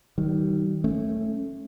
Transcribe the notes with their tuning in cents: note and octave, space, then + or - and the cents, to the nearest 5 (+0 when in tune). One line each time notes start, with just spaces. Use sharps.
D#3 +10 G3 -40
A3 +0 C#4 -20